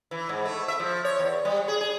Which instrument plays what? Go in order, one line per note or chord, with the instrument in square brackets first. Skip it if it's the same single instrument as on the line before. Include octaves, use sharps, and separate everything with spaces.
[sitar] E3
G#2
A3
E5
F3
C#5
E2
G3
G#4
G#4